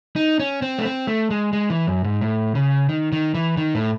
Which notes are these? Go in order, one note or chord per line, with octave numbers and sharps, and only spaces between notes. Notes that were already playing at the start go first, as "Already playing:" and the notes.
D#4
C#4
C4
A3
C4
A3
G#3
G#3
E3
F#2
G#2
A2
C#3
D#3
D#3
E3
D#3
A2